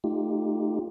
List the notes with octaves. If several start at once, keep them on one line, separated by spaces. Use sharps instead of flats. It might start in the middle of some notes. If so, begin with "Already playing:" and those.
A3 D#4 F4 G4